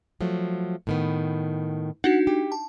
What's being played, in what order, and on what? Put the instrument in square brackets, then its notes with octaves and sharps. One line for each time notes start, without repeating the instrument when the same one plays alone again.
[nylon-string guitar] F3 F#3 A3
A2 D#3 B3
[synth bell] D4 D#4 F#4 [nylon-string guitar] F#5
[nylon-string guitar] G4
[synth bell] A5